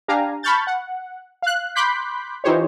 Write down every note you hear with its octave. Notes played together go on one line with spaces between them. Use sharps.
D4 G4 F5 G#5 A#5
A5 B5 C#6 F6 G6 A6
F#5
F5 F#6
B5 C6 D6 F#6 G6 B6
E3 D#4 F4 G4 C5 C#5